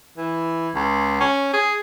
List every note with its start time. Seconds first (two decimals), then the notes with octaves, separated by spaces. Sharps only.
0.18 E3
0.75 C#2
1.20 C#4
1.53 G#4